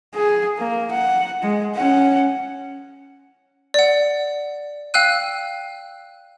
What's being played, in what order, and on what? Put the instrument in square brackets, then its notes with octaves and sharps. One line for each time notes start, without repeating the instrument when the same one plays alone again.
[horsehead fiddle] G#4
A#3
F#5
G#3
C#4 F#5
[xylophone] D5 F#5
F5 G5 E6 F#6 D#7